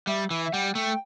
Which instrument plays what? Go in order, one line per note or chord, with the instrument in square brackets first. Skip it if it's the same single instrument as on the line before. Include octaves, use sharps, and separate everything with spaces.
[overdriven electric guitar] G3 [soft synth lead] E5
[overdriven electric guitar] E3 [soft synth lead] E5
[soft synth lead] E5
[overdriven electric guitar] G3 [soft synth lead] F#5
[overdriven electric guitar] A3 [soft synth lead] G5